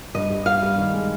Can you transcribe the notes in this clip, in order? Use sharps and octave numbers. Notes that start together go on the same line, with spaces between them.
G2 D#5
G3
G3 F5
G3
D#3
G#3